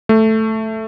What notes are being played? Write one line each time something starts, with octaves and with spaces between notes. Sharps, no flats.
A3